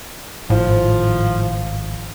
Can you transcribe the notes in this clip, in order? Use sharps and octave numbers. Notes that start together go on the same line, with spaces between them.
G#1 A2 F3